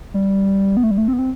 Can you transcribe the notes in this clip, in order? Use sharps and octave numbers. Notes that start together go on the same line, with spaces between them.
G3
B3
A3
G3
A3
C4
B3
C4